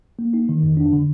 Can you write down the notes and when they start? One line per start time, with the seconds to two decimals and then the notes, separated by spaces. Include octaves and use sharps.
0.19 A#3
0.34 D#4
0.49 D#3
0.63 F2
0.77 D4
0.93 D3